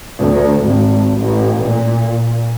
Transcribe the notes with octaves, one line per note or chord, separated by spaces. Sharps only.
D2
G#1
A1
A#2